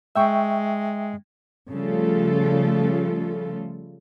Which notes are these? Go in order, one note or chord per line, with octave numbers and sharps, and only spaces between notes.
G#3 E5 G5 C#6
C#3 F3 G3 A3 F4 A4